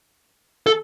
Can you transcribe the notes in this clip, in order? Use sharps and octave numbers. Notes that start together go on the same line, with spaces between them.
A4